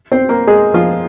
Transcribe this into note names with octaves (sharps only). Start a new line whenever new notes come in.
C4 C5
A#3 A#4
G#3 G#4
F3 F4